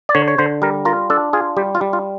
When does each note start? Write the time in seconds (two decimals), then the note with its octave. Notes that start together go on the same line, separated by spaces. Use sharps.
0.09 D5
0.15 D3 C#5
0.28 C#5
0.38 D3 C5
0.62 G3 A#4
0.85 F4 A#4
1.10 D4 A4
1.33 F4 G#4
1.57 G3 G4
1.75 F4
1.81 G3
1.93 F4